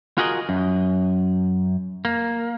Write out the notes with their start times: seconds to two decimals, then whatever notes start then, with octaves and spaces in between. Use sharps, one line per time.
0.18 F4 F#4 G#4 A#4 D#5
0.49 F#2
2.05 A#3